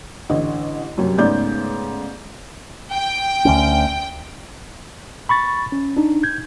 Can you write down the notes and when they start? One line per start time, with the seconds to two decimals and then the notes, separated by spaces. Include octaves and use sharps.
0.29 A1 D3 D#5
0.98 F#2 C3 F#3 G3
1.18 G#2 C#3 A3 B3 D5 G6
2.92 G5
3.45 D2 B3 C#4
5.29 B5 C#6 A6
5.72 C#4
5.97 D4 D#4
6.23 G6 G#6